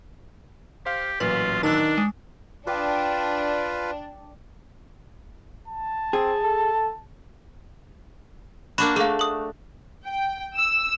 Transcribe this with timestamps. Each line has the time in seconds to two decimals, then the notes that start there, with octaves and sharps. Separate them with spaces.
0.86 G4 C5 F5
1.20 A1 A#2 F#3 F4 B4
1.63 D#3 D4 A5 E6 F#6
1.98 G#3
2.67 D4 F4 B4 G5 D6 D#6
5.68 A5
6.13 C4 G#4
6.44 A4
8.78 A#3 D4 F#4 B5
8.96 A3 G#4 F5
9.19 D#6 F#7
10.05 G5
10.57 E6